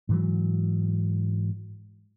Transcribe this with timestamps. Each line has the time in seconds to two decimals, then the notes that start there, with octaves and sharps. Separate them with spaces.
0.09 G#2 E3 F#3